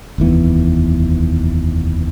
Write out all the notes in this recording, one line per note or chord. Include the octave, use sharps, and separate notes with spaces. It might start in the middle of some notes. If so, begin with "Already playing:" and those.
F1 D#2 E3 B3